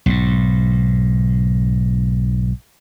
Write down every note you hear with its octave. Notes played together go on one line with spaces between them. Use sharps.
B1 G#2